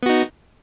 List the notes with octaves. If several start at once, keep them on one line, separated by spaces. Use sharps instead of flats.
B3 D#4 F#4